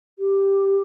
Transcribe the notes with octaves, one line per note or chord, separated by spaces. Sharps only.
G4